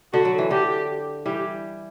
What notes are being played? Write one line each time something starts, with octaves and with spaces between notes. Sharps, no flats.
D3 F#4
F#3
E3
D3 G4
E3 G3 G4